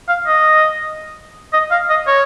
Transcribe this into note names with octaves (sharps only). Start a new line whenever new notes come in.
F5
D#5
D#5
F5
D#5
C#5